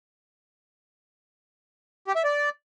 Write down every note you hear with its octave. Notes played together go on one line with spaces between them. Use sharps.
G4
E5
D5